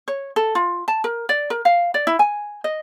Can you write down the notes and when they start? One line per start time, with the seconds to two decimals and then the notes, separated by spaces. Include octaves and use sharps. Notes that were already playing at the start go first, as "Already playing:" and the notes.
0.08 C#5
0.36 A4
0.55 F4
0.88 A5
1.04 A#4
1.29 D5
1.50 A#4
1.65 F5
1.94 D5
2.07 E4
2.19 G#5
2.64 D#5